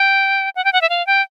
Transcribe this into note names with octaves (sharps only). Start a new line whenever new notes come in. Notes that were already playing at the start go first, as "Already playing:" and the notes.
Already playing: G5
F#5
G5
F#5
E5
F5
G5